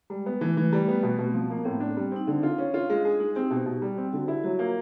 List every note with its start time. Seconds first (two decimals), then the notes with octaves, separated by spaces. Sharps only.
0.10 G3 G#3
0.26 B3
0.41 E3 A3
0.57 E3 A3
0.72 G3
0.88 B3
1.03 B2
1.19 B2
1.24 C4
1.34 F3 B3
1.50 A#3
1.65 A2 C4
1.80 D4
1.97 G3
2.12 C4 D#4
2.27 D3 D4
2.43 F4
2.58 C#4
2.74 F4
2.90 G#3
3.05 G#4
3.20 G#3 D#4
3.35 C4 G4
3.51 B2
3.66 B2
3.82 G3
3.98 C4
4.13 D3 F#4
4.28 E4 G4
4.44 F#3 F#4
4.59 A#3 F4